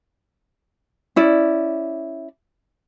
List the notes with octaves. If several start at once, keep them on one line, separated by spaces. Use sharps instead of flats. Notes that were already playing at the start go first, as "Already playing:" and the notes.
C#4 E4 D5